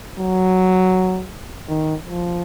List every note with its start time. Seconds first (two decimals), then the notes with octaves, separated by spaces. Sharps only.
0.20 F#3
1.69 D#3
2.06 F3